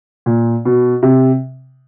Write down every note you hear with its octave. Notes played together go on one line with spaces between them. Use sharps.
A#2
B2
C3